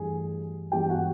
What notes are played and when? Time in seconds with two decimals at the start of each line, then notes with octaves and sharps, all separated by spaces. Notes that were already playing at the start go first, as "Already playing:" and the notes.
Already playing: G2 E3 A3 G#4
0.72 G2 E3 G#3 B3 G4 G5
0.89 F#4 F#5